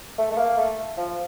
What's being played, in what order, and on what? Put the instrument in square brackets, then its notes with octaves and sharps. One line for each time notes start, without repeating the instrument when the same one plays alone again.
[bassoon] A3
A3
A#3
A3
F3